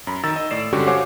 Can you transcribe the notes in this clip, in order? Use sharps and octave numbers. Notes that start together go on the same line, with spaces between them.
F#2 A#5 B5
D#3 A#5 E6 A6
D#5
A2 D5 C7 E7
G2 D3 G#3 C#4 F#4 G4
C5 C#5 F5 F#5 G#5 D6